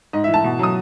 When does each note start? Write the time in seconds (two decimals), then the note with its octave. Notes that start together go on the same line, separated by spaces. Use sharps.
0.13 G#2 D#5
0.24 E5
0.28 E3
0.34 A5
0.44 B2
0.59 F#3 D#6